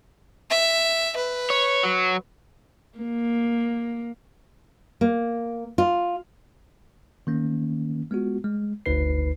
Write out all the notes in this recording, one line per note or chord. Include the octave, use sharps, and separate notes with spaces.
E5
B4
C#5
F#3
A#3
A#3
F4
D#3 A#3 C#4
G#3 B3 F4 F#4
G#3
G1 D2 D#4 B4 C7